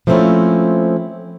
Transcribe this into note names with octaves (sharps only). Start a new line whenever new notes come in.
F3 A3 A#3 C4 C#4 E4